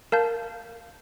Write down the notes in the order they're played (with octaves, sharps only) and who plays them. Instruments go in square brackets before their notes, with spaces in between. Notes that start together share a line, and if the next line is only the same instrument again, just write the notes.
[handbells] A#4 F5 A5 G6